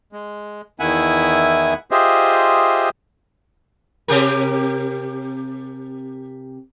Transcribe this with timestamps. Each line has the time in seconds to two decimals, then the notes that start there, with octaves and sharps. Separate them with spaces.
0.12 G#3
0.80 E2 D#3 E4 E5 F#5 G#5
1.91 F4 G4 G#4 C5 D#5 E5
4.08 C3 G4 A#4